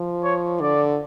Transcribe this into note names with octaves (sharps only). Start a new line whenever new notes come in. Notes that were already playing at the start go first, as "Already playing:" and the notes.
Already playing: F3
C#5
D3 D5